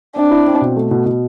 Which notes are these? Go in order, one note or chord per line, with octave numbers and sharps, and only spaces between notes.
C4 D4
E4
C4
B2
A3
B2
B2